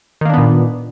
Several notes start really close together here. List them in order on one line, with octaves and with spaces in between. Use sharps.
D#3 A#3 D4 B3 A#2